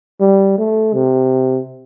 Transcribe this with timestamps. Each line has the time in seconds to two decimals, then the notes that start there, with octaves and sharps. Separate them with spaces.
0.20 G3
0.58 A3
0.94 C3